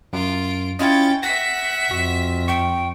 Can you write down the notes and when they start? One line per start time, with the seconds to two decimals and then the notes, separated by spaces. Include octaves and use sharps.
0.13 F#2 F4 D7
0.79 C#4 E4 F4 D#5 G5 A6
1.23 E5 F#5 A#6 B6
1.91 F2 F#4
2.48 G5 C#6